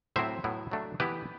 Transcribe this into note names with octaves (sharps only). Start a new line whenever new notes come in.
A2 F#3 C4 E4 C5 E5
A2 F#3 B3 E4
F#3 A3 D4
E3 B3 E4 G4 B4